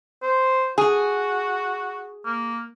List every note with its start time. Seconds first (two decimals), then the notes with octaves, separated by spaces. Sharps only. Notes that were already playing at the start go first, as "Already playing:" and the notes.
0.22 C5
0.78 F#4 G#4
2.25 A#3